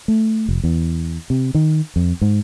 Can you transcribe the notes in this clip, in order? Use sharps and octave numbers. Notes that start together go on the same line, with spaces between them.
A3
F1
E2
C3
D#3
F2
G#2